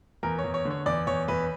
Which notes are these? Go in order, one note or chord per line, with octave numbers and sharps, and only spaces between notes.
E2 A#4
C#5
E2
C#5
D3
C#5
E2 D5
E2 C#5
E2 B4